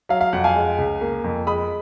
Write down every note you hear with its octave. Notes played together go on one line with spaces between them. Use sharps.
F#3 F5
F5
F2 F#5
F5 G#5
G#3
C#2
A#3
F2
G#3 B5 D#6